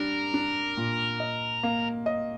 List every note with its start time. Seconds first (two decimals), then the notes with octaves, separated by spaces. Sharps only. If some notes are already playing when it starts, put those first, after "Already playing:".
Already playing: G3 D4 A#4
0.34 D4
0.77 A#2
1.20 D#5
1.63 A#3
2.06 D#5